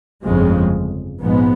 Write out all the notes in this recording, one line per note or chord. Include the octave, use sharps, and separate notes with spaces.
G1 F2 C#3 F3 G#3
A#1 G#2 F3 G#3 B3